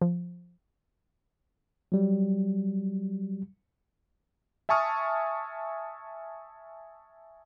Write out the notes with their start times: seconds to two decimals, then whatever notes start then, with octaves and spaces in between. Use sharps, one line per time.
0.01 F3
1.92 F#3 G3
4.69 E5 G#5 A5 C#6 D#6 F6